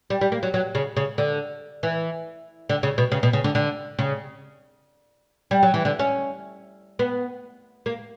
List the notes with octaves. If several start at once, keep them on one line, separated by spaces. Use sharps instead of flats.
G3
G3
A#3
F#3
F#3
C#3
C#3
D3
E3
D3
C#3
B2
C#3
B2
C#3
D3
D3
C#3
G3
F#3
E3
D3
C#4
B3
A#3